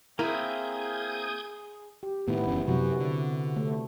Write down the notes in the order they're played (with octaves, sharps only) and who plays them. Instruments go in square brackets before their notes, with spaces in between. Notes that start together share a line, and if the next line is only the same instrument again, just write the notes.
[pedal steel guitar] A#3 C4 [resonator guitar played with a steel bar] E4 A#4 [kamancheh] G#4 [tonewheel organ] D#6 G6 G#6
[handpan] G4
[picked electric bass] A2 D#3 [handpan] B3 E4
[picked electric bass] F#1 E2 C#3
[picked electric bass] F#2 F#3 [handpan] C3 F#4
[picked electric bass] D3
[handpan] A3